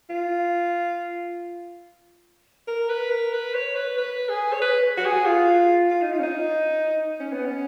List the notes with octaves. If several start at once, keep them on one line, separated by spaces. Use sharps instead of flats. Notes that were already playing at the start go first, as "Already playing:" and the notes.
F4
A#4
B4
A#4
B4
C#5
B4
B4
G#4
C#5
B4
F#4
G#4
F4
F4
D#4
F4
C#4
D#4
C#4
B3
C#4